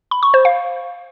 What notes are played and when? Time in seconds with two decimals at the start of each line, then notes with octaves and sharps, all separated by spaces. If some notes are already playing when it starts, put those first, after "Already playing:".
0.11 B5
0.23 C#6
0.34 C5
0.45 F5